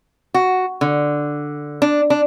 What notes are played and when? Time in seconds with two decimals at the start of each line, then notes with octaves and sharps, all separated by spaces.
0.34 F#4
0.81 D3
1.82 D4
2.10 D4